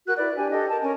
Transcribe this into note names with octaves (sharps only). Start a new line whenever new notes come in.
F#4 A#4 F#6
E4 B4 D5
D4 G4 G#5
G4 A4 D#5
A#4 A5
C#4 A#4 G#5